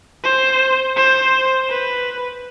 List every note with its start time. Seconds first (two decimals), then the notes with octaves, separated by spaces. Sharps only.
0.23 C5
0.96 C5
1.70 B4